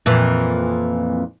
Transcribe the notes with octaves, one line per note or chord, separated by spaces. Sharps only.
F2 A#2 E3